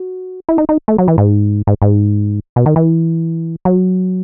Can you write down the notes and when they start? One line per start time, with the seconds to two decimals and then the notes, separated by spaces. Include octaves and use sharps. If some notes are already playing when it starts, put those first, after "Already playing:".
Already playing: F#4
0.49 E4
0.58 D#4
0.69 D#4
0.88 A3
0.98 F#3
1.08 E3
1.18 G#2
1.67 G#2
1.82 G#2
2.56 B2
2.66 D#3
2.76 E3
3.65 F#3